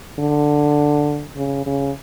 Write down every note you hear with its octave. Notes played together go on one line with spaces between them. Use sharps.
D3
C#3
C#3